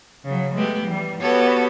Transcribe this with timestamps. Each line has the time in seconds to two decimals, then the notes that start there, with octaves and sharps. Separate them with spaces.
0.25 C#3 F#3
0.55 G#3 A3 B3 G4
0.83 E3 G3
1.20 B3 F#4 G4 A4 C#5